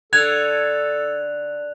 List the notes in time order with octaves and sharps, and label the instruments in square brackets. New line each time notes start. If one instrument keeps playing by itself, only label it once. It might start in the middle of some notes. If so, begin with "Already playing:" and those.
[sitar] D3 [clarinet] A4 [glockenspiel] F#6 F7 [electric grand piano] G#6